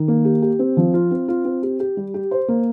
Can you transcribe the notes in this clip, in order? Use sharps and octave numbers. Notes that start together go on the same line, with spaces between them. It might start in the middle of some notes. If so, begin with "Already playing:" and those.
Already playing: D#3
A#3
G4
G4
C4
F3
F4
C4
F4
C4
G4
G4
G3
G4
C5
A#3